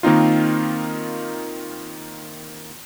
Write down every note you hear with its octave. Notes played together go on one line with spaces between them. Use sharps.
D#3 A#3 C4 D#4 F4